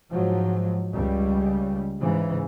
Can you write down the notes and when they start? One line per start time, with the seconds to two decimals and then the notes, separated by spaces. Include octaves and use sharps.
0.11 G#2 F3 F#3
0.93 C#2 C#3 G3
1.99 G#2 C#3 E3